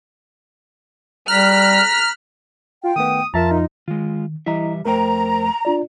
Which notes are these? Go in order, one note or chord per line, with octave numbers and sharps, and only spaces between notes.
G3 A#5 F6 F#6 B6
F4 G5
D#3 A3 B3 D#6
F2 F3 F4 A#4 E5 A5 A#5
D#4
D#3 G#3 F4
E3 G3 E4 D#5 E5 A#5
F2 A3 A#4 C5 G5 A#5
D4 F4 D5